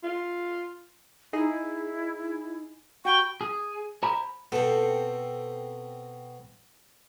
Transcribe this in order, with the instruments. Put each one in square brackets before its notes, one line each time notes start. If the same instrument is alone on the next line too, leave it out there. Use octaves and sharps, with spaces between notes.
[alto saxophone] F4
[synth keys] D#4 G#4 [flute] E4
[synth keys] F#4 G4 B4 [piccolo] G5 [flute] C#6
[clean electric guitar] G#4
C5 G#5 A#5 B5
[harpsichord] B2 [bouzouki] C4 A4